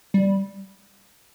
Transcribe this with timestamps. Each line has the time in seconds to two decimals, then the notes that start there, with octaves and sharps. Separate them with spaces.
0.14 G3